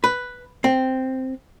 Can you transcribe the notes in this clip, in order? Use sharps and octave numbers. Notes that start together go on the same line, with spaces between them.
B4
C4